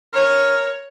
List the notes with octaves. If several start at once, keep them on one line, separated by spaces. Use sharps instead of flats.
A#4 C#5